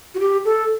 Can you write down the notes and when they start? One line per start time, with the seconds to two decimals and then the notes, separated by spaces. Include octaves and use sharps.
0.15 F#4
0.20 G4
0.45 A4